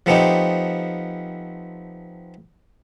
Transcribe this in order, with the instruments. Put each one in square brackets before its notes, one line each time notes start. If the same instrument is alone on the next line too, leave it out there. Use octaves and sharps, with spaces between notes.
[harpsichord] F3 A3 B3 C4 D#4 G4